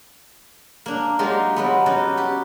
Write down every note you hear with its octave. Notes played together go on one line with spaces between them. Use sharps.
A#3 D4
F#3 G#3 A#3 D#4 F4 G4
F#3 G#3 B3
C#4 D#4 F#4 D5
G4